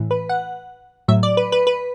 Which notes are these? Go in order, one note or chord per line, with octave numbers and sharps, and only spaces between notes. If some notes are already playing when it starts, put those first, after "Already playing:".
Already playing: A2 E3
B4
F#5
A2 F#3 E5
D5
B4
B4
B4